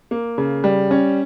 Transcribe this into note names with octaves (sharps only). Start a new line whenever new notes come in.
A#3
C#3
G3
C#4